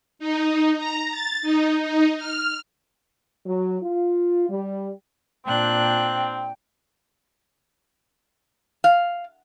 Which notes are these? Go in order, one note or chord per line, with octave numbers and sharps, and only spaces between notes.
D#4
A#5
A6
D#4
D#4
F6
F#3
F4
G3
A#2 C4 D4 G5 F#6
F5